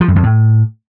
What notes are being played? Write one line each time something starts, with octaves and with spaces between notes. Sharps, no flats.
F3
F#2
F2
A2